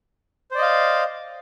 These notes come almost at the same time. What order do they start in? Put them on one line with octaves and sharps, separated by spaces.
C5 D5 D#5 F5